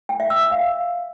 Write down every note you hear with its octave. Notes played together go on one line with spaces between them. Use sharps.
G5
E5
E6
E5
F5